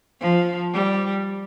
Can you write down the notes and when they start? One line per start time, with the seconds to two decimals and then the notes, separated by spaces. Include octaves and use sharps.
0.20 F3
0.73 G3